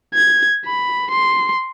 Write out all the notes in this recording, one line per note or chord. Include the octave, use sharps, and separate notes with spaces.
G#6
B5
C6